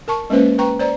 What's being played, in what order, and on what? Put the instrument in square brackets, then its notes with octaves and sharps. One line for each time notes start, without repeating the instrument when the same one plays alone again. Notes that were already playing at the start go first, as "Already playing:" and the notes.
[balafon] A#4 A5 C#6
G#3 A#3 C#4 B4 C5
B4 G5 A#5 C#6
C5 D5 A#5